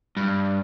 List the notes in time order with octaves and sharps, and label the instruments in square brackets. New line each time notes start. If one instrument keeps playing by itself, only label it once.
[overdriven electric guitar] G2